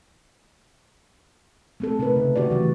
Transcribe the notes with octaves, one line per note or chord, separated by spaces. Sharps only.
A3 C4 A4
C3 A3 D#4 A#4 B4
C#3
D#3 F#4 G4 D5
E3 F#3 A3